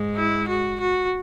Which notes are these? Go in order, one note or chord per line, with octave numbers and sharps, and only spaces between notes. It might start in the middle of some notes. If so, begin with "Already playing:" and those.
Already playing: G#2 G#3
E4
F#4
F#4